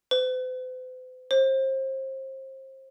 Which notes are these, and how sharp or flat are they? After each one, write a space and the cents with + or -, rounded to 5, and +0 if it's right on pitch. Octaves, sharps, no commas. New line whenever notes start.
C5 -45
C5 +30